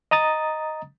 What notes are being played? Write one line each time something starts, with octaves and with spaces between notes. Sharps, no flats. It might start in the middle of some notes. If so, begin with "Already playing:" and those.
D#5 A#5 D#6 A6